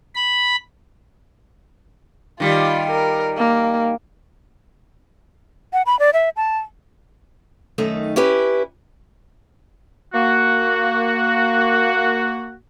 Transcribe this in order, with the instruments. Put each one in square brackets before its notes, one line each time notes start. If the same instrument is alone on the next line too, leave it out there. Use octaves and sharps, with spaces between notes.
[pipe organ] B5
[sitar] D#3 G3 [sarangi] F4
[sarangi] A#4
A#3
[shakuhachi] F#5
B5
D5
E5
A5
[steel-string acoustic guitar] F#2 D#3 A3 D#4
C#4 E4 G4 B4
[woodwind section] A#3 F#4